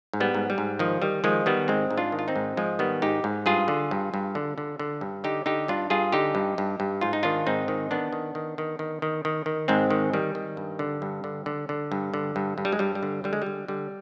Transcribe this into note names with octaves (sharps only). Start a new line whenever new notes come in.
G#2
G3 B3
G#2
G3
G#2
D#3 F3
D#3 G3
D#3 F3 G#3
D#3 G3 B3
G#2 G#3 C4
G#2
D4 F4
D#3
F4
C4 D#4
G#2
G#2 F3 G#3
D#3 G3 B3
G#2 D#4 G4
G#2
G2 F4 G#4
D3
G2
G2
D3
D3
D3
G2
D3 D#4 G4
D3 D#4 G4
G2 D4 F4
G2 F4 G#4
D3 D#4 G4
G2
G2
G2
G#2 F4
D#4
D#3 D4 F4
G#2 C4 D#4
D#3
D#3 B3 D4
D#3
D#3
D#3
D#3
D#3
D#3
D#3
G#2 G#3 C4
D#3
D#3 G3
D#3
G2
D3
G2
D3
D3
D3
G2
D3
G2
G2
G3
G#3
G2 G3
G3
D3
D3 G3
G#3
D3 G3
D3 G3